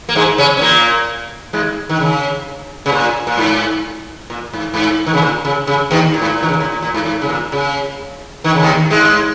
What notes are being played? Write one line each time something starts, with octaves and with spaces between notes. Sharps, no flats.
A#3
G#2 G#3
C#3 C#4
C#4
A#2 A#3
G#2 G#3
D#3
C#3
C#3
A#2
A#2
G#2
A#2
G#2
G#2
D#3
C#3
A#2
C#3
C#3
D#2 D#3
A#2
G#2
A#2
A#2
D#3
C#3
A#2
A#2
A#2
G#2
G#2
C#3
A#2
C#3
D#3
C#3
D#2 D#3
G#2 G#3